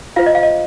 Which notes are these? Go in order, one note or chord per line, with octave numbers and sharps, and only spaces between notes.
F4 C5 F5
D#5
F5
D#5